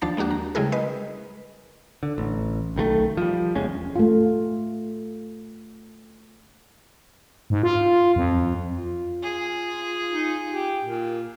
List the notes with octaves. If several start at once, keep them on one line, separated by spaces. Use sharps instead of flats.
D#2 F3 D4 A5 A6 C7
G#3 A#3 D4 F#4 G4
A#5
C#3 G3 G#3 E4 G#4 A#4
G#3 B4 D#5
D3
A1
B1 D#3 G3 A3
F3 G3
F1 E2 G#3 C#4
A3 F4
G#2
F4
F2
F4
G#4
D#4
G4
A#2